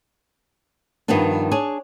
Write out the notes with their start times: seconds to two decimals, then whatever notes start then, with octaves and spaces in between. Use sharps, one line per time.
1.08 G2 D#3 F3 G3 B3 D4
1.51 D4 G#4 C#5